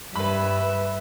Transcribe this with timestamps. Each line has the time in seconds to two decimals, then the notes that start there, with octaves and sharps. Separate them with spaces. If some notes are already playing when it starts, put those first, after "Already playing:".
0.16 G2 B4 E5 B5